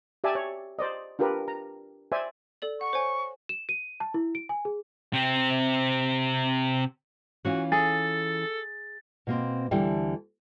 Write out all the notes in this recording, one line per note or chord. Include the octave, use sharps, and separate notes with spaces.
G4 D5 E5 G#5 A5
C#5
C5 D5 D#5
D4 F4 G4 A#4 B4
A#5
C5 D5 E5 G#5
A4 D5 F#7
F#5 C#6
C5 C#5 G#5
E7
D#7
A5
E4
D7
G#5
G#4
C3 C4
E3 C#4 F4 F#4
G#4 A4 A6
B2 A#3 C4
D2 D3 E3 G3 G5